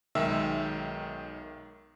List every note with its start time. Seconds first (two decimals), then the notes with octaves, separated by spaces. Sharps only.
0.15 B1 D#3 G#3 E5 G5 E6